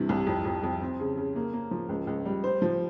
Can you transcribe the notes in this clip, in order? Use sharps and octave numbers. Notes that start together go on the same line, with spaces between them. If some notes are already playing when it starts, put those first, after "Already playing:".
Already playing: G2 C3 E3
C2
F2
F2
F2
C4
C#3
C#3
A#3
A#3
F3
C#2
C#2
G3
C5
F3